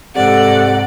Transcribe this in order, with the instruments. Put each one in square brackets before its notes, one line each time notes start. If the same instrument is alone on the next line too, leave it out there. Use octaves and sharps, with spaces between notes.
[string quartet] G#2 D5 [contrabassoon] C3 [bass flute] A4 [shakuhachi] F#5